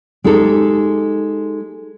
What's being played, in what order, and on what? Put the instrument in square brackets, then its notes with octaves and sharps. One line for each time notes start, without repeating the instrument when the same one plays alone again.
[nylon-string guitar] G#3 D#4 G4 A4